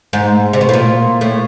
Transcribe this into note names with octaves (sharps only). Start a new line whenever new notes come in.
G#2
C3
B2
A2
A#2
A2